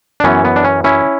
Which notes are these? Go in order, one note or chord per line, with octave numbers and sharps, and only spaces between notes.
D4
F#2 E3 B3 C#4
B3
D4
C#4
C#4 E4